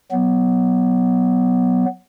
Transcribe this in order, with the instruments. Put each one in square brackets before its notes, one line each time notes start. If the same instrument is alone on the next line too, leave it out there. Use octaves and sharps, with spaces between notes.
[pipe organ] F#3 B3